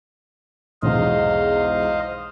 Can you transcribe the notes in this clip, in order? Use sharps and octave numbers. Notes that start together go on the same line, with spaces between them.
B1 E2 G#2 C5 D#5 F5